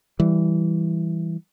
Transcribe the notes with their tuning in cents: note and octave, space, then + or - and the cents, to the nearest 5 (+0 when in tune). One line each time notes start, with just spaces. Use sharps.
E3 +0 G3 +0